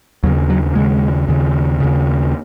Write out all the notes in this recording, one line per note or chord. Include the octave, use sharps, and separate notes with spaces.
D#2 C#3 F#3
F#3
D#2 C#3 G#3
D#2 C#3
D#2 C#3